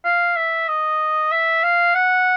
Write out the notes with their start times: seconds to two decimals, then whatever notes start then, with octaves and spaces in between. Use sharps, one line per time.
0.05 F5
0.36 E5
0.68 D#5
1.31 E5
1.63 F5
1.95 F#5